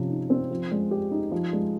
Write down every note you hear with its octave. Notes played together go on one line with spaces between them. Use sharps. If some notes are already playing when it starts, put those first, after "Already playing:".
Already playing: C3 F3 C#4
D#4
C4
F3
G#3
G4
D#4
F3
G#3